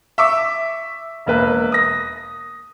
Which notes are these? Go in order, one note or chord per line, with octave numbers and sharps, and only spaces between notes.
E5 C#6 D6 E6
E1 A#3 B4
D#6 A#6